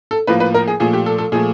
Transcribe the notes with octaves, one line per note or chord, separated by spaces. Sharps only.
A4
A2 F3 A#3 B4
B4
A#4
G#4
A#2 F3 A3 G#4
G4
A4
A4
A#2 F3 A3 G#4